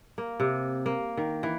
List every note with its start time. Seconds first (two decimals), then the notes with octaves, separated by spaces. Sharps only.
0.18 A#3
0.40 C3
0.86 A#3
1.17 D#3
1.43 E3